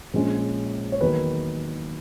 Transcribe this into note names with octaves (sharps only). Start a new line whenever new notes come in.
A#1 A#2 G#3 C#4
C#5
E2 D#3 F#3 A#3 B4